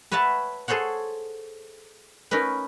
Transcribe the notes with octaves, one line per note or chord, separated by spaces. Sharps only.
B4 C#5 E5 F#5 A5
G#4 A4 C5 C#5 F#5
C#4 D#4 A#4 B4